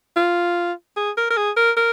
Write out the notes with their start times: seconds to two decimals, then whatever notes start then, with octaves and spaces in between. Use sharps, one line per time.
0.16 F4
0.97 G#4
1.17 A#4
1.30 A#4
1.37 G#4
1.57 A#4
1.77 A#4